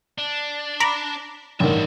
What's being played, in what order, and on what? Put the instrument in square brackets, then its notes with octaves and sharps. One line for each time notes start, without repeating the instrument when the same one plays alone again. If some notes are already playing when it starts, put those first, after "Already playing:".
[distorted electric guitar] D4
[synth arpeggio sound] A#5 B5 D6
[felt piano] A1 G2 D#3 [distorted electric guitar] D#4 E5